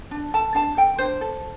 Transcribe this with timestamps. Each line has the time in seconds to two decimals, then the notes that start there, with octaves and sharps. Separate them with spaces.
0.11 D4
0.34 A4 A5
0.55 D4 A5
0.77 A4 G5
0.98 D4 C5
1.21 A4